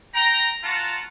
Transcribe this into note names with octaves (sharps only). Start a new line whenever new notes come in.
G5 A#5
F4 F#4 F#5 A5 A#5